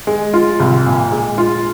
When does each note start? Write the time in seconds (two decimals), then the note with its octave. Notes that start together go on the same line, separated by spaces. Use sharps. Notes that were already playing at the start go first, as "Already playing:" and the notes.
0.07 G#3
0.33 F4
0.60 C2
0.86 A#2
1.12 G#3
1.38 F4